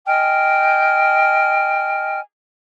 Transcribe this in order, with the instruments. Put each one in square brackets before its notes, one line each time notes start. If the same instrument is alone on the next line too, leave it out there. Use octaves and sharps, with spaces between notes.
[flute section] D#5 G5 G#5 F6